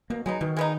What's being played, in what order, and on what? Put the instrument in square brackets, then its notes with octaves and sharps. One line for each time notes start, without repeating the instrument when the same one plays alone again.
[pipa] B2 [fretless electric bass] A#3
[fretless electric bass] F#3 [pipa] G#3 B3 D#4
[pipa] B2 [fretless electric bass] D#3
[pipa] G#3 B3 D#4